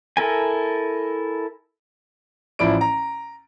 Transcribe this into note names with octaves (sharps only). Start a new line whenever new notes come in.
E4 A4 A#4 G#5
A1 F3 E4 D5 D7
A#5